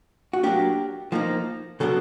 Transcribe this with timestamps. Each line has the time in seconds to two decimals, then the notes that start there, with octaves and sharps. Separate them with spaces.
0.33 F#4
0.43 F#3 A#3 D4 G4
1.12 F3 A#3 D#4
1.80 C#3 F#3 B3 D4 A4